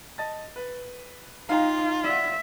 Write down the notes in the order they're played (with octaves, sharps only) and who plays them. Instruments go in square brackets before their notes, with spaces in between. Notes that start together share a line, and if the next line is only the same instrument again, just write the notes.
[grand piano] D#5 A5 A6
B4
[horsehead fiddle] D#4 [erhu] F4 [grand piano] F5 G5 A#5
[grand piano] D5 F#5 [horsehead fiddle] E5